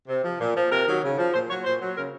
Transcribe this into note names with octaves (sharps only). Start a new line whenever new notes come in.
C3
F3
A#2
F3
C3 A#4
D#3 F#3
C#3
F3
A#2 C5
F#3 C#5
A#2 C5
F#3
C#3 A#4